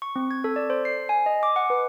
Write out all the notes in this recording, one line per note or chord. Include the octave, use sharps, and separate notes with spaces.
C#6
C4
G#6
A4
D5
C5
C7
G#5
D#5
D6
F#5
B4